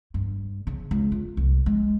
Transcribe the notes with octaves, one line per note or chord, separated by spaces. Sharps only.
G2
C#3
C#2
F4
C2
G#3